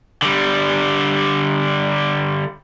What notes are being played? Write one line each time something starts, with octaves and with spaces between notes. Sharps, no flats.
D3 G3